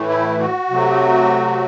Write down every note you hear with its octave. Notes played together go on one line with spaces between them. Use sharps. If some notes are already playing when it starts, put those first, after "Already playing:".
Already playing: A2 E3 A3
E4
F#4
C3 F#3 A3